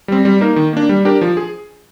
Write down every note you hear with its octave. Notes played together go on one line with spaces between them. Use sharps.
G3 C4
G3
A#3 D#4 A#4
D#3
A#3 D4
G3
D4 G4 A#4
F3
G#4